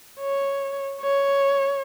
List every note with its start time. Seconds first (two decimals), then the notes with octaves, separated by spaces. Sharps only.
0.20 C#5
1.01 C#5